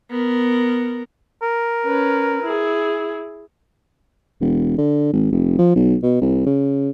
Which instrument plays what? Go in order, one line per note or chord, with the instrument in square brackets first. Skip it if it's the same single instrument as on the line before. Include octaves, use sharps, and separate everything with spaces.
[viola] B3 A#4
[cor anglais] A#4
[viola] C#4 B4
E4 G#4
[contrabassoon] E1
D3
G#1
F1
F3
B1
B2
C2
C#3